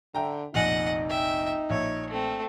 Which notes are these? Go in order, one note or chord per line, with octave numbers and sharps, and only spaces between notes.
D3 E5 G5 A#5
F1 A#1 D#4 D#5 F#5 G#5
E5 G5
A#1 C#5 E5
A3 C4